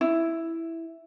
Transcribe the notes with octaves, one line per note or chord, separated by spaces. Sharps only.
E4